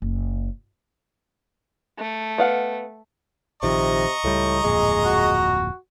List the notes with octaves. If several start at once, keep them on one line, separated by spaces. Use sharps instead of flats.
F#1
A3
B3 F5 F#5
A#1 C3 D#3 F3 D#5 A#5 C#6
C#2 A2 G3
D1 F2 A#2 G#3
F#4